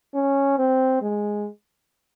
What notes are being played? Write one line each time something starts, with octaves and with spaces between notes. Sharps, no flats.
C#4
C4
G#3